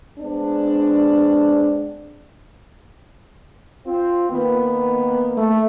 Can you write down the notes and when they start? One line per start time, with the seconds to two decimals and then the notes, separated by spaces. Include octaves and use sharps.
0.19 G#3 B3 C4 D4
3.86 C4 F4
4.30 D#3 A#3 B3
5.38 A3